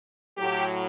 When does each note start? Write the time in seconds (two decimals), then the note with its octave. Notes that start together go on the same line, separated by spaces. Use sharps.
0.38 A2 F#3 G4